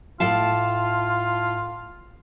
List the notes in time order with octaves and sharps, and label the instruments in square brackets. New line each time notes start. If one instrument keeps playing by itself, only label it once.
[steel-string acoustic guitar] A2 F5 A5 [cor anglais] F4